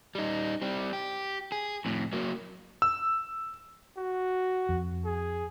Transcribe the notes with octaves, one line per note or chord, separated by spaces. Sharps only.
G3 D#4
G3 C4
G4
G#4
F2 A2
F#3 A#3
E6
F#4
F2
G#4